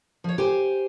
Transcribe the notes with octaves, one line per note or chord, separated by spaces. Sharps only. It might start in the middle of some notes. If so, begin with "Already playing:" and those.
F3 C#5
G4 C5 G#5